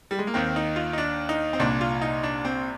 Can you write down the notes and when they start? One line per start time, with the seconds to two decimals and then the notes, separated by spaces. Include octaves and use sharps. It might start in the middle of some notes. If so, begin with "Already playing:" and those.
0.11 G3
0.19 G#3
0.27 A#3
0.34 D#2 D#3 C4
0.56 D#4
0.76 F4
0.93 D#4
0.98 D4
1.29 D#4
1.53 C4
1.60 C2 A#2 D4
1.81 F4
2.02 D#4
2.23 D4
2.45 C4